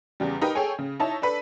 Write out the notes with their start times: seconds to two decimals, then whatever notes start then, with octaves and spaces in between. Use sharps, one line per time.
0.20 E2 C#3 G3
0.41 D#4 G4 A#4 B4 D#5 F5
0.55 G#4 A4 C#5 G5 G#5
0.79 C#3
1.00 D#4 E4 C#5 A5
1.22 D4 A4 B4 B5 B6